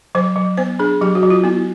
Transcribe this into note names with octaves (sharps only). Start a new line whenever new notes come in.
F#3 C5
F#3
B3 C5
D4 G#4
F#3 G4
F#4
F#3
F4
B3 E4